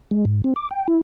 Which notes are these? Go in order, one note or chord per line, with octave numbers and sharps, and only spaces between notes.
G#3
G#2
C4
D6
G5
E4